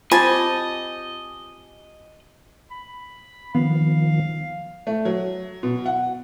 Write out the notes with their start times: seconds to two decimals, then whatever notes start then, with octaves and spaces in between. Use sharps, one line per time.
0.11 C4 F4 G4 D#5 G#5 A5
2.71 B5
3.55 D#3 F3 B3 F5
4.87 A3
5.05 F#3
5.63 B2
5.86 F#5